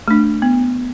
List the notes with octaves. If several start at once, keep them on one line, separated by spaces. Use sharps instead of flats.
A3 D4
B3